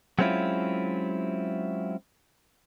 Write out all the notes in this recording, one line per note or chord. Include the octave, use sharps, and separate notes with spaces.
F#3 G#3 C4 C#4 E4 F4